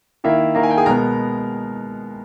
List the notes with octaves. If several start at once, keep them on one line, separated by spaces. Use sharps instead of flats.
D#3 A#3 E4 E5
D#3 A#3 A#5
G#5
G5
G#4 G#5
B2 G#3 B3 A#4 A#5